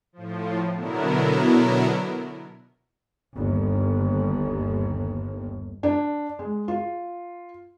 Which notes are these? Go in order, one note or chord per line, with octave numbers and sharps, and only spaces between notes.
A2 F3
B2 D3 F#3 B3 E4 A#4
G1 D#2
D4
G#3
F4